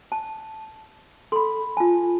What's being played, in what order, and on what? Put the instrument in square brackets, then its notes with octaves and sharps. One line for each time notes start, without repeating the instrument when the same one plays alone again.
[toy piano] A5
[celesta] A4 B5 [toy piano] C6
[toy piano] F4 A5 [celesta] G#5